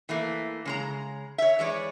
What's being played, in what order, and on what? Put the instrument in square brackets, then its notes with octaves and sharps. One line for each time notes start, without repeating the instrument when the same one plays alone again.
[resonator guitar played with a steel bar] E3 A3 A#3
C#3 G#3 A#5
C#5 E5
E3 G#3 C#5 D5